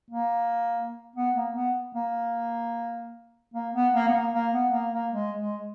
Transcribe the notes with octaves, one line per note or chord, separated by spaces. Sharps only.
A#3
B3
A#3
B3
A#3
A#3
B3
A#3
B3
A#3
A#3
B3
A#3
A#3
G#3
G#3